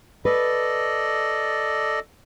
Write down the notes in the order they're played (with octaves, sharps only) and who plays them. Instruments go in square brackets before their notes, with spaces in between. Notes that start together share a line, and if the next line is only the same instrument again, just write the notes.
[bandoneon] A4 D5 D#5 [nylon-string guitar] B4